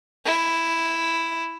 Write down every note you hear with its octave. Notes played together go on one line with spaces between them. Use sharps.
E4